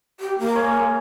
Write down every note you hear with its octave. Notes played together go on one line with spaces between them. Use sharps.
G4
A#3
G#3 C#5